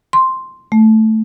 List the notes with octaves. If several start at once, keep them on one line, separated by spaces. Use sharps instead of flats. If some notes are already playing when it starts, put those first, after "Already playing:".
C6
A3